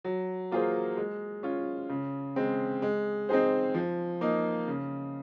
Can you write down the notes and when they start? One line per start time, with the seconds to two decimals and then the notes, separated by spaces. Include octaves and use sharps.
0.05 F#3
0.52 A#3 F4 G#4 C5
0.97 G#3
1.43 C#4 F4
1.89 C#3
2.36 G#3 C4
2.82 G#3
3.29 C4 D#4 G#4 C5
3.74 F3
4.21 A#3 D#4
4.68 C#3